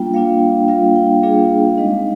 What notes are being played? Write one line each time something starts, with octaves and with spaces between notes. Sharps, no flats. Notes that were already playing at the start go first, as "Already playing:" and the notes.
Already playing: G3 A#3 D4 F4 G5
G3 A#3 D4 F4 F5
G3 A#3 D4 F4 F5
G5
G3 A#3 D4 F4 G#4
F5
G#3 C4 D#4 D#5